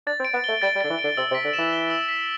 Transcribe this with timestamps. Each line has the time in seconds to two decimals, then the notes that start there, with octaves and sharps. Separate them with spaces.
0.06 D4 A6
0.20 C4
0.25 D7
0.34 B3
0.44 A3 G7
0.62 G3 A6
0.76 G3
0.81 D3 A6
0.90 E3
0.99 D7
1.04 D3
1.17 C3 E6
1.31 C3
1.35 B6
1.44 D3
1.53 E3 E7
1.73 G7
1.90 E6
2.08 B6